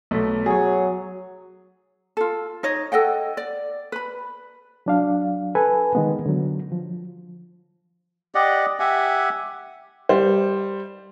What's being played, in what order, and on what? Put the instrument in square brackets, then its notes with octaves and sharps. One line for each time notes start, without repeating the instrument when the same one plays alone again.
[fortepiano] B1 A3
[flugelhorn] F#3 [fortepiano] G#4 C#5
[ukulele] F4 A4
D#4 C#5 D#5
A4 D#5 F#5 G5
D5
B4 B5
[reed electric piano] F#3 D4 F5
A4 B4 G#5
D#3 G#3 B3
D3 F#3
F3
[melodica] G4 D5 D#5 F#5
G4 E5 F#5 G#5
[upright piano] G3 C5